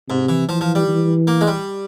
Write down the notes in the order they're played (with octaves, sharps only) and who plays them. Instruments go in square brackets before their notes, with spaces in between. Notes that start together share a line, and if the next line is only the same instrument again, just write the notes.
[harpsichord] G#2 [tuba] C3
[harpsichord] E3
[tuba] E3 [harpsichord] F3
[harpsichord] F3
G3
[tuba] E3
[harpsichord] A#3
G#3
G3